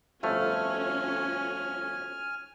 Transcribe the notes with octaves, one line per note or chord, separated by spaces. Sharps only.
G1 F2 A3 C#4 F4 F#4 G#5 F6